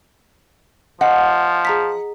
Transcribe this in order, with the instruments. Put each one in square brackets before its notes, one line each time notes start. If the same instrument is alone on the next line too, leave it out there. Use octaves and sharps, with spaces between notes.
[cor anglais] F3 [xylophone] D#5 [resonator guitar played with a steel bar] F#5
[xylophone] G#4 A#5 B6